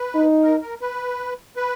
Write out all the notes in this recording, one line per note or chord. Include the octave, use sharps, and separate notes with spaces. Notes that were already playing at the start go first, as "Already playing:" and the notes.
Already playing: B4
D#4
A#4
A#4
B4
B4